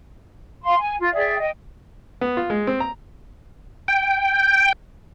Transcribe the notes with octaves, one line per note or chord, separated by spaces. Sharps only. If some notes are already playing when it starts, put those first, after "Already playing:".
F5 C6
G#5
F4
G#4 D5 E5 G5
D#5 G5
B3
F4
G#3
C4
A#5
G5